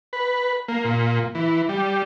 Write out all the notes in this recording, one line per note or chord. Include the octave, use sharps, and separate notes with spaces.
B4
A#3
A#2
E3
G3